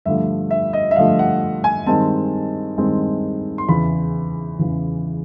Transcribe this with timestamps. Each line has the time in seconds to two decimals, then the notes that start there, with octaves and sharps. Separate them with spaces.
0.06 G2 D3 F3 A3 E5
0.51 E5
0.73 D#5
0.91 E5
0.96 G2 D3 F3 A3 F5
1.19 F#5
1.64 G#5
1.87 G2 D#3 G#3 C4 A5
2.78 G2 D#3 G#3 C4
3.58 C6
3.68 E2 C#3 E3 B5
4.59 E2 C#3 E3